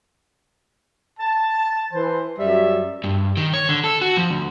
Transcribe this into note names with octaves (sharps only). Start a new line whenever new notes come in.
A5
E3 C5
F#2 G3 E5
G2
D#3
C#5
D3
A4
F#4
F3
D2